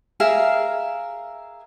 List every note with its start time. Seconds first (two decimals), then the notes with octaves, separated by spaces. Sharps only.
0.20 G#4 A#4 E5 F5